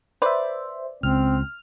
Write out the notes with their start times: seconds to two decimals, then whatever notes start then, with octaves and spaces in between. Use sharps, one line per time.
0.22 B4 C5 D5 E5
1.03 C#2 C4 F6